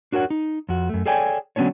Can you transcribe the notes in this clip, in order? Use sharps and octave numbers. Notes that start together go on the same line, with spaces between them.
D4 F#4 A#4 C#5 F#5
D#4
F2 F#4
F#2 A3
G#4 A4 C#5 D5 G5 G#5
D3 F#3 B3 C#4 D4 C#5